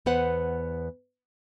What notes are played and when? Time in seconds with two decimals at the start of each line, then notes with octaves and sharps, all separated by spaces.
0.06 E2 B3 B4 C5 F#5